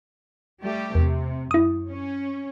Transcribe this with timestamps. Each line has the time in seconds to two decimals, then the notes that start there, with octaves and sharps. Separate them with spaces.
0.62 G3 A3 G4
0.95 E2 C3
1.51 F#2 E4 D#6
1.89 C#4